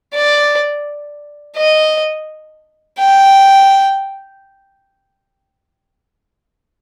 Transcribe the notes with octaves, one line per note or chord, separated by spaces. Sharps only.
D5
D#5
G5